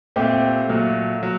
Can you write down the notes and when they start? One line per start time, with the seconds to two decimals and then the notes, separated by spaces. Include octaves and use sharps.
0.16 A#2 A3 C4 G4
0.69 A#2 F#3 A3
1.23 F#3